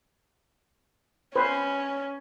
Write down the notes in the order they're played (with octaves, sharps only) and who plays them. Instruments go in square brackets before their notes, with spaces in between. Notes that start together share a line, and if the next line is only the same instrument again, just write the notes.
[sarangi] C#4 [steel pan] B4 C5